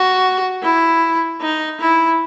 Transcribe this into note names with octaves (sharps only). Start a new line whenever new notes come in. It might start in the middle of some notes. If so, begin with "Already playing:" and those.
Already playing: F#4
E4
D#4
E4